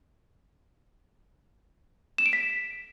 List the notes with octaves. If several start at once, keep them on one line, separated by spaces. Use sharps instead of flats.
E7
D7
B6